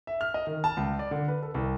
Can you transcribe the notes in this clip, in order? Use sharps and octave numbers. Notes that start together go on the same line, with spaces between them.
E5
F6
D#5
D#3
A5
C#2
D5
D3
B4
A4
C2